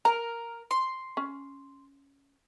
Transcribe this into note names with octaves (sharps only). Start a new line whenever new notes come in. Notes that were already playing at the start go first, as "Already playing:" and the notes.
A#4 A#5
C6
C#4